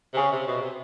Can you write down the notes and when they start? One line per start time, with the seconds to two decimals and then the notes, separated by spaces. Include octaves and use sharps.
0.14 C3
0.17 C#3 G#5
0.32 C3
0.47 B2
0.61 C3